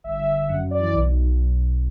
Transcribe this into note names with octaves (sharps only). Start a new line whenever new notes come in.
G1 E5
G1
G1
F#2 F#5
F#2
D5
E3
B1
B1
B1